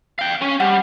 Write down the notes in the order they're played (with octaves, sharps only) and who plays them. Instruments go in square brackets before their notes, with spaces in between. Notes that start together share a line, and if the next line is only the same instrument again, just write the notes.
[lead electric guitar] F5 G5
C#4
[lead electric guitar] G3 [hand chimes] F#5